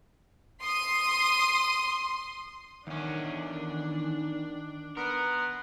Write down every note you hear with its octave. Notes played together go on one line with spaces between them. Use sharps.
C6 D#6 D#7
E2 D#3 C#4 D4
B3 A#4 C6